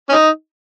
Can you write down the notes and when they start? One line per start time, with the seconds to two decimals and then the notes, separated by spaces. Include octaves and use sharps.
0.09 C#4
0.12 D#4